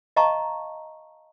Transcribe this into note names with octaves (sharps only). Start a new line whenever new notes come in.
D#5 F5 A5 A#5 C#6